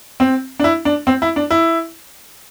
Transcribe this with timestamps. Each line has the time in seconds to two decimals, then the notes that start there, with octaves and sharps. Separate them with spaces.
0.20 C4
0.60 D4
0.64 E4
0.85 D4
1.07 C4
1.22 E4
1.36 D4
1.51 E4